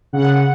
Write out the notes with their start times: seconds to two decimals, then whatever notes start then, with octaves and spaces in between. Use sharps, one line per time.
0.13 C#3 F#5